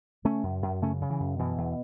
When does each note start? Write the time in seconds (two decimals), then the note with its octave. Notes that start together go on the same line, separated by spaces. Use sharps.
0.24 C#3 A3 C#4
0.43 F#2
0.62 F#2
0.82 C#3 A3 C#4
1.01 C#3
1.10 E3
1.20 F#2
1.39 B2 E3
1.58 E2